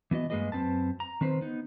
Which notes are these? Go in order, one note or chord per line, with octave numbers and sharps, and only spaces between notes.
E3 B3 F#4 D#5
G2 G#3 A#3 G#4 B4 D#5
F#2 C4 B4 A5
A#5
D#3 C4 B4 C5
B3 D#4